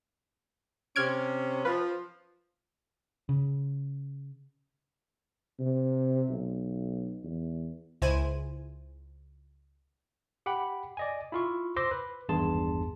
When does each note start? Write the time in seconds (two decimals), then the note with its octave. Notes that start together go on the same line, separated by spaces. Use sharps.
0.96 C3 C#4 F6 G#6 D7
1.65 F3 B4
3.29 C#3
5.60 C3
6.29 B1
7.24 E2
8.02 C#2 E4 C5 G#5 D#7
10.46 G4 F#5 G5 B5
10.97 D5 D#5 G#5
11.32 E4 F4 C#6
11.76 C5 C6 D6 E6 A#6
11.91 B4
12.29 G#1 E2 G2 G#4 A5 C6